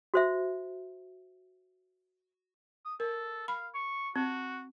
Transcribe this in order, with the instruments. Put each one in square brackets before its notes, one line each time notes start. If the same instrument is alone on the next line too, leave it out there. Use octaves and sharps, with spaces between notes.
[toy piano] F#4 C5 E5
[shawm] D#6
[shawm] A4 [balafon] A#4
[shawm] F5 [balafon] B5
[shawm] C#6
[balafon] C4 [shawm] F#4